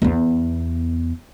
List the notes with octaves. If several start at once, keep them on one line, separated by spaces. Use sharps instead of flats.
E2 B3